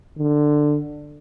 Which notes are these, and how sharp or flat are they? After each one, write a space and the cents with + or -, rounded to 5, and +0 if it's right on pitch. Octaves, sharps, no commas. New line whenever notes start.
D3 +15